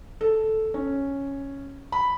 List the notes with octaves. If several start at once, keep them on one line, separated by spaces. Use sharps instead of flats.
A4
C#4
B5